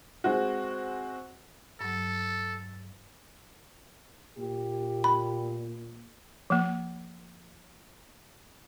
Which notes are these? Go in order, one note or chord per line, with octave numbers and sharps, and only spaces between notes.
G#3 C4 F#4
G2 F#3 A4
A#2 G4
B5
F3 A#3